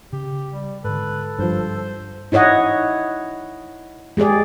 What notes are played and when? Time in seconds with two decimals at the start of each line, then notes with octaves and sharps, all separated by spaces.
0.13 C#3 G4
0.51 G3
0.84 G#2 D3 A4 B4
1.39 G2 F3 C5
2.32 D#4 E4 C#5 D#5 F#5
4.17 G#3 G4 G#4 D5